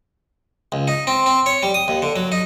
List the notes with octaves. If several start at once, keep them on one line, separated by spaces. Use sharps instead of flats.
C#2
D#4
C4
C4
C#5
G3
D#6
D#2
D3
F#3
D#4